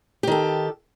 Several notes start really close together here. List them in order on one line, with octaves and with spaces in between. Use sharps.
G4 D#3 A4